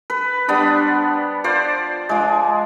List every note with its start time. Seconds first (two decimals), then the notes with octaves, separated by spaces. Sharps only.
0.10 B4
0.48 G3 B3 D4 C5
1.44 F4 C5 D5
2.09 F3 G#3